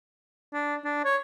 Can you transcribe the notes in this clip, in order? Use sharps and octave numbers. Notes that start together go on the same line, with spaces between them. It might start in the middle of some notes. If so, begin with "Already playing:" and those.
D4
D4
C#5